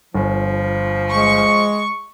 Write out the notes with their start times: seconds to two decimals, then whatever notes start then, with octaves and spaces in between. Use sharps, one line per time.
0.15 G1 F3
1.11 G#3 C#6